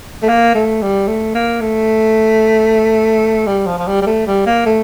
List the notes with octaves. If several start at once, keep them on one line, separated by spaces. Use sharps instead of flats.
A3
A#3
A3
G3
A3
A#3
A3
G3
F3
F3
G3
G3
A3
G3
A#3
A3